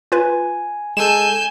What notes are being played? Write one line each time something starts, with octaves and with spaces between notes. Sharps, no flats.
F4 B4 G#5
G#3 A4 G#5 G6 E7